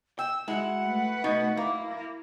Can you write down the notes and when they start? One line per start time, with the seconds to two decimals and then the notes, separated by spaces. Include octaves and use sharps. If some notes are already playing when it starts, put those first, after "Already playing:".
0.19 G5 E6
0.48 G#3 E4 F#4 F#5
0.82 A3 B4
1.24 B2 D#4
1.57 A#3 E4